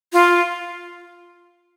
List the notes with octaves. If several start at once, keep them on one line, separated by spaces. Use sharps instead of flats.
F4